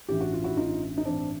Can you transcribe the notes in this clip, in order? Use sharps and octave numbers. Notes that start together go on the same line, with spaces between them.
A1 G2 E3 G4
F#4
F4
E4 F#4
A1 G2 E3 D#4 F4
D#4
A1 G2 E3 C4 D4